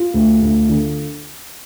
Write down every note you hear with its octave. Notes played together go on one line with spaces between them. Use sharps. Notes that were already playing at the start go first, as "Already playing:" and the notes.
Already playing: F4
D2
D2
D3